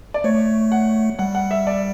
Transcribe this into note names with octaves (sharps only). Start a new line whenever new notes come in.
D5
A3 C#5
F#5
G3 F#5
F#5
E5
D5